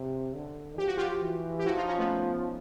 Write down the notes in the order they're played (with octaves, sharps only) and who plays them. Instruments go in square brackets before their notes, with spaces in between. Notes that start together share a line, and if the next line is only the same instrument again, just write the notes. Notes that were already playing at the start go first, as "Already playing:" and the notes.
Already playing: [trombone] C3
D3
[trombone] F3 [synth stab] G4
[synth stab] F#4
F4 G4
[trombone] E3
[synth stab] G4
[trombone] F3 [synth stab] E4 F#4
[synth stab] D#4 F4
C#4 D#4
A3 B3